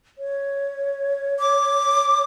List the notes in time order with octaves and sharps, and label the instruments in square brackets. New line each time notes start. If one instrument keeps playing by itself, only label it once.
[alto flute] C#5
[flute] D6